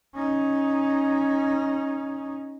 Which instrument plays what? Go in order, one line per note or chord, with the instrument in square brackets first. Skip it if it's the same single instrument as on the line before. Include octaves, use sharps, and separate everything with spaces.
[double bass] C#4 D#4